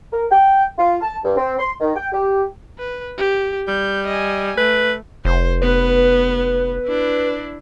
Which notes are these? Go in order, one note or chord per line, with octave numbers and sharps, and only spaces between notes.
A#4
G5
F4
A5
G2
C4
C6
D#3
G5
G4
B4
G4
G3 G6
D#5 G#5
A3 B4
F1 C5
B3 B4
D4 E4